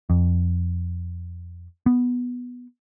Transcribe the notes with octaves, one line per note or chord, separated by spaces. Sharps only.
F2
B3